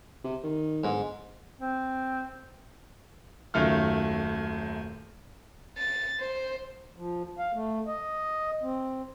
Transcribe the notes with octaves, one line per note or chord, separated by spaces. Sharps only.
C3
D#3
G1 G#2
C4
D#1 F#2 D#3 A3 F4 F6
A6
C5
F3
F5
A3
D#5
C4